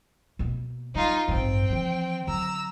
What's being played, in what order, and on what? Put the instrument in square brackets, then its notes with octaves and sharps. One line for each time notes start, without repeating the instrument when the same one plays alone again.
[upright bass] B2 A#3
[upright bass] G3 [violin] D#4 F4
[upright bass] A1 G2 [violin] C4 G5
[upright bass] E3 F3
[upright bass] D3 F#3 [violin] A#5 E6